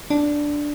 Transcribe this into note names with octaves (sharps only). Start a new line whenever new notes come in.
D4